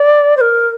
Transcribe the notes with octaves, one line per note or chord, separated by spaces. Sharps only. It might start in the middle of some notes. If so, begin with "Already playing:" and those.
Already playing: D5
C5
A#4